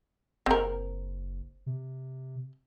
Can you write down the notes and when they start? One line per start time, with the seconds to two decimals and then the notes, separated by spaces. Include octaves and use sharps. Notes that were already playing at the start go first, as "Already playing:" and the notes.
0.46 F#1 C4 A#4
1.66 C3